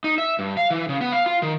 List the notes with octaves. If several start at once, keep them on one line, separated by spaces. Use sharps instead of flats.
D#4
E5
G2
F5
E3
C#3
B3
F5
F4
D#3